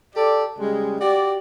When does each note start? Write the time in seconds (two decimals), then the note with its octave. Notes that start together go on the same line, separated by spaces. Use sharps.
0.16 G4 A4 D5
0.59 C#3 G3 G#3
1.01 F#4 G4 D5